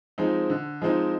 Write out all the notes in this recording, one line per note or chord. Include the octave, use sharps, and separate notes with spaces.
F3 G#3 C4 D#4
D3
F3 G#3 C4 D#4